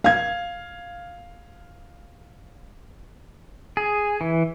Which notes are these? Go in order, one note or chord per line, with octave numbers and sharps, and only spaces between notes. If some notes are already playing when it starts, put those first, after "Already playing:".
F5 G#6
G#4
E3